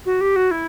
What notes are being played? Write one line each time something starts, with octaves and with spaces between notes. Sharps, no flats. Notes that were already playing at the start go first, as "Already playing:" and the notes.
F#4
G4
F#4
E4